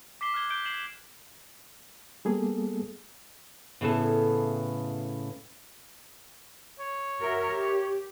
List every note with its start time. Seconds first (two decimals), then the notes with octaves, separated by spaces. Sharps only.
0.21 D6 B6 C7 G7
0.34 F6 F#6 G#6 G7
0.50 G6 D7 G7
0.65 G#6 C7 E7 F#7
2.25 G3 A#3 B3 G#4 A4
3.81 A2 C#3 B3 E4 A4
6.79 C#5
7.19 F#4 A#4 E5
7.51 G4